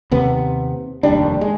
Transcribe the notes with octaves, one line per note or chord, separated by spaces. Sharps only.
D#2 C3 B3
F1 D#2 G3 D4
G#3